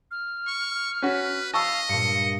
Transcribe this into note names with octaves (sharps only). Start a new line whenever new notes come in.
F6
C#6
C#4 F#4 B4
D#5 F5 A5 C#6 E6
G2 A#2 C#7